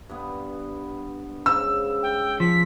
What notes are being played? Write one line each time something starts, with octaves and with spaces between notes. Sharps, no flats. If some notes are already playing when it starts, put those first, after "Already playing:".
G2 B3
G#2 C#3 E6
G5
F3 B6